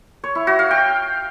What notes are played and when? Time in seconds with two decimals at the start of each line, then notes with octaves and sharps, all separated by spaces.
0.24 C#5
0.35 E4
0.47 F#4
0.59 F5
0.71 G5